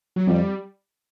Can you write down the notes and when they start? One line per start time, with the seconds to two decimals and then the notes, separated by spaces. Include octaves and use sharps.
0.16 F#3
0.27 F2 G3